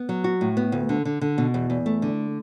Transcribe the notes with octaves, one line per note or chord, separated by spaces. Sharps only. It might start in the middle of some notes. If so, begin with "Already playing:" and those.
Already playing: B3
F#3
F#4
A2
B3
D2
D3
D3
D3
B2
E2
E2
A3
D3